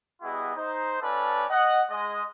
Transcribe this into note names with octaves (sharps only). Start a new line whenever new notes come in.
G3 B3 E4 F#4 G#4 D#5
D#4 C5
C#4 F4 A4 B4 D5 A5
D#5 F#5
G#3 D#5